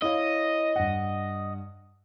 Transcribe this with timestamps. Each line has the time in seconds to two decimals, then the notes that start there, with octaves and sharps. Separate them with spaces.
0.02 E4 C#5 D#5 F5
0.76 G2 F#5